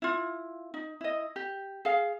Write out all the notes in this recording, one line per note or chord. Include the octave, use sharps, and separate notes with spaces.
E4 F4
D#4
E4 D#5
G4
G#4 F5